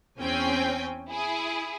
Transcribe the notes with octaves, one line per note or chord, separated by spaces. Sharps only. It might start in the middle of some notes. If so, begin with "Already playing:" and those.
E2 C4 C#4 G5 G#5
E4 G#4